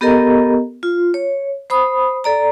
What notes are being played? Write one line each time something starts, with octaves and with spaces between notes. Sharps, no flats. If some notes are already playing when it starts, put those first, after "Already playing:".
B3 G4 A4 A#4 D#5 A#5
F4
C#5
C5 B5 D#6
A4 D5 A#5